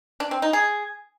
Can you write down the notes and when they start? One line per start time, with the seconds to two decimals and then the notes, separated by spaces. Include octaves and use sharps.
0.20 D4
0.31 C4
0.42 D#4
0.53 G#4